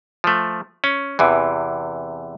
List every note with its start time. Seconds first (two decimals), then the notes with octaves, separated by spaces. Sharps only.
0.24 F3 A3
0.84 C#4
1.19 E2 C3 E3